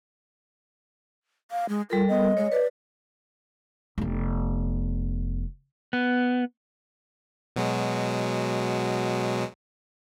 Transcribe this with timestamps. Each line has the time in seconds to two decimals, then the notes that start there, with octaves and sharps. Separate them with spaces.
1.51 F5
1.69 G#3
1.90 G3 F4 A4 A#4
2.09 B3 D#5
2.37 G#3 C#5
2.52 B4 D5
3.98 F1 B3
5.93 B3
7.56 B2 F#3 G#3